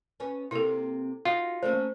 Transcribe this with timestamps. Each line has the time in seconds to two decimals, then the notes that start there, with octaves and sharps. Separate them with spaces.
0.20 B3 C#4
0.51 C3 A#3 E4 A4
1.25 D#4 F4 F#4
1.63 A3 A#3 C#4 C5